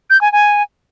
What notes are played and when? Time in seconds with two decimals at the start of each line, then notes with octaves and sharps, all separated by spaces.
0.10 G6
0.21 G#5
0.32 G#5